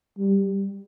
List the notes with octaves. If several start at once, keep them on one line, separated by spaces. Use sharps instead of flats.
G3